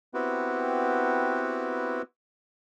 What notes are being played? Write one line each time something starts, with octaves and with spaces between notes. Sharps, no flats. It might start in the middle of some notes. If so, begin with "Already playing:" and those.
B3 C4 E4 F#4 G4 B4